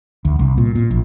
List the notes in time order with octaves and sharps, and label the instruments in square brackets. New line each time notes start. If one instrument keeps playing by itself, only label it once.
[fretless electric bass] D2
C2
A#2
A#2
A#1